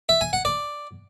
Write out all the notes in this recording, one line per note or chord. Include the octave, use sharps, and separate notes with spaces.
E5
G#5
F#5
D5